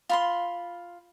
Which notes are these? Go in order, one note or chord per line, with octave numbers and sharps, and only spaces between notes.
F4 B5 C6